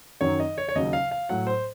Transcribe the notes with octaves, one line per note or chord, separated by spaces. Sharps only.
F#2 D#3 F#3 C#5
D#5
C#5
C#5
D#2 C#3 F#3 D#5
F5
F5
A2 F#3 F#5
C5